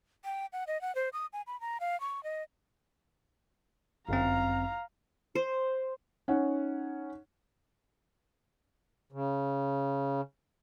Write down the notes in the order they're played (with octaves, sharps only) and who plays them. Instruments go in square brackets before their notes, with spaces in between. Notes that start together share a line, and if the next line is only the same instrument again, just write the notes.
[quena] G5
F#5
D#5
F#5
C5
D#6
G#5
B5
A#5
F5
C#6
D#5
[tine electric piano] G1 F#2 C4 [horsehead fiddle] F5 A#5
[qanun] C5
[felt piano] C#4 D#4 F#5
[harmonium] C#3